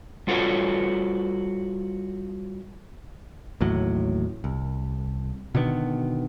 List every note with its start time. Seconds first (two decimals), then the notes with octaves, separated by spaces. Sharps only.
0.27 G3 F4 F#4 A4 B4 C#5
3.61 A1 D#2 A2 F#3
4.44 C2
5.55 B2 D3 D#3 B3